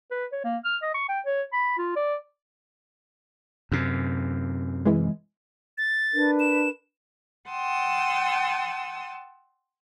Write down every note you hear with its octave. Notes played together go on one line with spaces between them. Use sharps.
B4
C#5
A#3
F6
D#5
C#6
G5
C#5
B5
F4
D5
F#2 C3
E3 G#3
A6
D4 A#4 B4
E7
F#5 G5 A5 C6 D#6 E6